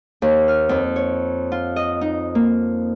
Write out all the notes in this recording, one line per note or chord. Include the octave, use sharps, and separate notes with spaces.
D#2
F6
F2
C#5
F4
D#5
D#4
A#3